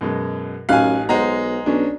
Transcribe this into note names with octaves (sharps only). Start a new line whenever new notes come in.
F#2 B2 G#3
A1 F#2 D#4 F5 G#5 F#6
B1 G#3 C5 F#5 A#5
B1 C#4 D4